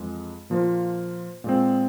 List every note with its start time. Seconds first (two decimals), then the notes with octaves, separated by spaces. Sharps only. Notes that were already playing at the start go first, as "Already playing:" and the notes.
Already playing: F2 E3 G#3
0.50 A#2 F3 A#3 F4 C5
1.44 A#2 G#3 C4